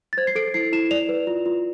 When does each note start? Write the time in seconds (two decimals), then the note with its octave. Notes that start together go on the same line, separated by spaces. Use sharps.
0.13 A6
0.18 C5 G#6
0.27 C7
0.35 A4 D7
0.54 E4 C7
0.72 E4 E7
0.91 D5 F7
1.09 B4
1.27 F4
1.46 F4